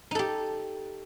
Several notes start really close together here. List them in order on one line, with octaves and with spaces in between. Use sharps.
D#4 A4 G4